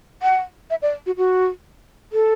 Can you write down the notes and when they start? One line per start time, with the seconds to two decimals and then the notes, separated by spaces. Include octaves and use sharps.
0.23 F#5
0.70 E5
0.82 D5
1.06 F#4
1.17 F#4
2.13 A4